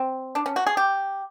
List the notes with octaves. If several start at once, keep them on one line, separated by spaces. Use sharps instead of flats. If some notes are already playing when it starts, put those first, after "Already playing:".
Already playing: C4
D4
C#4
F#4
G#4
G4